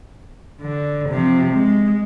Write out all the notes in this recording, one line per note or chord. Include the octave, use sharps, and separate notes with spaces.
D3
C3 F3
G#3